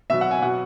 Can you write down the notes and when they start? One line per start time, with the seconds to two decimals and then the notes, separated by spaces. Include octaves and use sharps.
0.10 B2 F#3 E5
0.21 F#5
0.31 G#5
0.42 B2 F#3 F#5